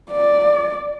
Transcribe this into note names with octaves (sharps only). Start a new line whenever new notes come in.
D5